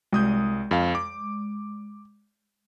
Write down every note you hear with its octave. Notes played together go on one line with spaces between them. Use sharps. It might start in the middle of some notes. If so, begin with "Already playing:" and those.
C2 G#3 D#6 G6
F2 F5
D6